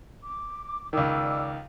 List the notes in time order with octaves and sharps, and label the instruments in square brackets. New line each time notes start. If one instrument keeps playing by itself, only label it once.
[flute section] D6
[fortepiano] C#2 D#3 [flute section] D5 D6 E6